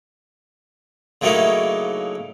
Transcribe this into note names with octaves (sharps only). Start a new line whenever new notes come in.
C#3 F#3 A3 A#3 D#4 E4